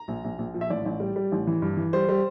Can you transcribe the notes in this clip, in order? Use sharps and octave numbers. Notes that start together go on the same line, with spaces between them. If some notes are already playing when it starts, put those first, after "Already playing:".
Already playing: A#5
A#1
A#1
A#1
F3
E5
A1 D5
A1
G3
G3
A1
E3
G2
E3
G3 C5
G3